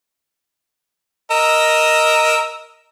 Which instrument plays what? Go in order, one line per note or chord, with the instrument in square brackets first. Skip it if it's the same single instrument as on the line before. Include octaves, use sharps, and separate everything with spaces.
[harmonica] A#4 D#5 E6